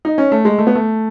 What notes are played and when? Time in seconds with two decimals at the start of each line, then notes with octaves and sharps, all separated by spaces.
0.05 D#4
0.18 C#4
0.32 A3
0.45 G#3
0.58 A3
0.67 B3
0.75 A3